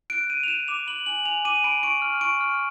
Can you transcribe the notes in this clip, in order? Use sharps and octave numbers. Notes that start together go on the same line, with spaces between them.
F#6 D7
G6 D#7
F7
G6 E7
D6 F7
B5 F#7
G#5 F#7
G#5 F7
D6 D#7
B5 D7
C#6 D7
F6
C#6 D7
F6